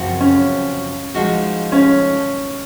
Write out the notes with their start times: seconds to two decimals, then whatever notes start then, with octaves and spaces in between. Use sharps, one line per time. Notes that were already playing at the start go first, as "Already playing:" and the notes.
Already playing: F#2 C#3 F3 C4 F#4
0.20 C#4
1.14 F3 G#3 D#4 F#4
1.72 C#4